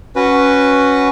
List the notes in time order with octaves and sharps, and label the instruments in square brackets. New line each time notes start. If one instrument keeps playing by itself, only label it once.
[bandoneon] C#4 F#4 B4